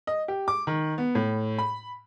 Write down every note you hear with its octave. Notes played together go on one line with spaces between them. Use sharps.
D#5
G4
D6
D#3
B3
A2
B5